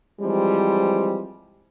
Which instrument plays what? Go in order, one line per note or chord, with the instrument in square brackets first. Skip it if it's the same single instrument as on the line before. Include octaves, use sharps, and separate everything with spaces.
[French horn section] E3 F3 G3 G#3 C4